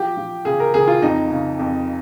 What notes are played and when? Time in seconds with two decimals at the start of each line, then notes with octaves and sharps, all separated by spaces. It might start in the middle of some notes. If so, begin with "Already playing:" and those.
Already playing: F3 G4
0.17 F3
0.45 C#3 G#4
0.60 A#4
0.74 C#2 G#4
0.87 F4
1.02 F2 D#4
1.31 C#3
1.59 F2